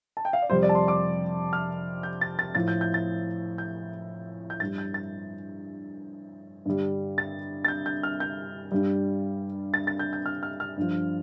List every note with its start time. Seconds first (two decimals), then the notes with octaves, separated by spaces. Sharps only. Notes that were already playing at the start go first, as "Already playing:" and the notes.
0.17 A5
0.25 G5
0.33 F5
0.42 D5
0.50 F2 C3 G3 C5
0.63 D5
0.69 A5
0.75 C6
0.88 D6
1.53 F6
2.03 G6
2.21 A6
2.39 A6
2.55 A2 F3 A6
2.68 G6
2.81 G6
2.94 A6
3.58 G6
4.50 G6
4.60 G2 G3 A6
4.78 G6
4.94 A6
6.65 G2 D3 G3
7.18 A6
7.65 A6
7.68 G6
7.86 G6
8.03 F6
8.20 G6
8.72 G2 G3
9.74 A6
9.87 A6
9.99 G6
10.13 G6
10.26 F6
10.43 F6
10.60 F6
10.77 G2 F3